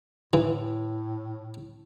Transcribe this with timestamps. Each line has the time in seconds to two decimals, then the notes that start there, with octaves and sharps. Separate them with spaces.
0.33 A2 E3